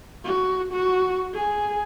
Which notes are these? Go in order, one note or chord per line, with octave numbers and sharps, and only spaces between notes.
F#4
F#4
G#4